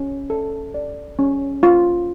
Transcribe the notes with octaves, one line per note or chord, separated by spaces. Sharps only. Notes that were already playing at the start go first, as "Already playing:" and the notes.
Already playing: C#4
A4
D5
C#4
F4